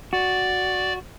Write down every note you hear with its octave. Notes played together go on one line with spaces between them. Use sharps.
F#4 D5